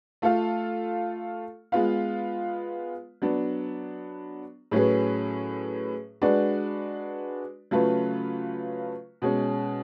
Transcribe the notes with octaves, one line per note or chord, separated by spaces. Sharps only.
A3 F4 A4 F5
G#3 B3 F4 B4 F5
F#3 B3 D4
A2 F#3 C#4 G#4 B4
G#3 D4 F#4 B4 D5
C#3 F#3 A3 F4 B4
B2 G#3 C#4